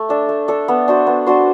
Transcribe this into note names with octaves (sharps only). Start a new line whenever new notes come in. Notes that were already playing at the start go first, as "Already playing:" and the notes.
Already playing: A3
D4 A4 E5
A3
D4 A4 E5
B3
D4 F#4 C5
B3
D4 F#4 C5